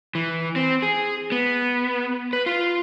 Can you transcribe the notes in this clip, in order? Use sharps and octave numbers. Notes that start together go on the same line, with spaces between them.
E3
C4
G#4
B3
B4
F4